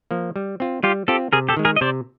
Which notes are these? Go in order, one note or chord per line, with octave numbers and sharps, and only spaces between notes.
F3 A#3
G3
C4 F4
G3 F4 G4
C4 F4 G4 A4
C3 G#4 A#4
G4 A4
D#3 G#3
G#4 A#4
D#5
C3 C5 D5